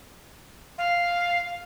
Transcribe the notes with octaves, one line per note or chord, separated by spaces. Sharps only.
F5